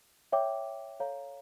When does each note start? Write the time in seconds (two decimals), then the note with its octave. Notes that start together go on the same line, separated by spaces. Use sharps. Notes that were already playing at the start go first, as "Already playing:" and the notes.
0.32 C#5 E5 G5 D6
1.00 A4 C#5 F5 A#5